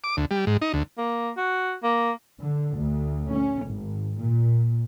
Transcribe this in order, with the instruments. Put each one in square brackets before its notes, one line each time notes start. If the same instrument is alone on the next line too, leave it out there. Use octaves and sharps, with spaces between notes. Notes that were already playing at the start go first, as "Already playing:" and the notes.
[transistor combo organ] D6
D2
G3
G#2
D#4
D2
[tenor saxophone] A#3
F#4
A#3
[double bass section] D3
D2
C#4
G#1
A#2